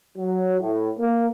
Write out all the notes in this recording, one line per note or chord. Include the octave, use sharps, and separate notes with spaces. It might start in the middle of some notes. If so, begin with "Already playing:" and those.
F#3
A2
A#3